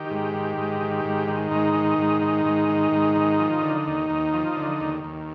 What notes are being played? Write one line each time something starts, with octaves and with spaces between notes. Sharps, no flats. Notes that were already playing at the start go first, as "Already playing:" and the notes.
Already playing: D#3 G4
G#2
D#3
G#2
D#3
G#2
D#3
G#2 D#4
D#3
G#2
D#3
G#2
D#3
G#2
D#3
F3
D3
D#2
D#2
F3
D3
D#2
D#2